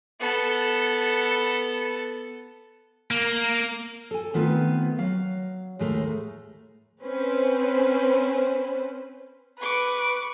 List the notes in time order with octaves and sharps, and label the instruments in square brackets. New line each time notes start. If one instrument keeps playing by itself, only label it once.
[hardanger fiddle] B3 A4
[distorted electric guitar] A#3
[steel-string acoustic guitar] A4 G#5
D#3 A3 B3 C4 F4 B4
F#3 F5
D#2 A2 G#3 A3 A#4
[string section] C4 C#4 B4 C5
[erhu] B4 [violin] C#6 D6